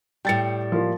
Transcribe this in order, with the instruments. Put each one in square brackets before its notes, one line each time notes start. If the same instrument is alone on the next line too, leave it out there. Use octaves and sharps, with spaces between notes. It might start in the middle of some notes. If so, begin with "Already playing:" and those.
[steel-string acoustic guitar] A2 G3 [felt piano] G5 A6 C#7
[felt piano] F3 A#3 F4